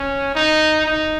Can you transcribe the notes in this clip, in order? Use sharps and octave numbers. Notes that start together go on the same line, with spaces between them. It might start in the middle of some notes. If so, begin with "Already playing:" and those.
Already playing: C#4
D#4
D#4